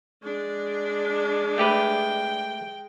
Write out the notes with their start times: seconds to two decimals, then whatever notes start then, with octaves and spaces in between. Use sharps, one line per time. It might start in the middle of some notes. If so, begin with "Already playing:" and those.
0.23 G#3 D4
1.58 A3 G4 B4 G5